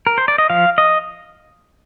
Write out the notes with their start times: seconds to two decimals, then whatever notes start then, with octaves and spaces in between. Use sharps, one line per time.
0.07 A#4
0.18 C5
0.28 D5
0.38 D#5
0.50 F3 F5
0.78 D#5